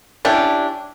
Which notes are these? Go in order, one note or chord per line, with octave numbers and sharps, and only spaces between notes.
C#4 D4 E4 G4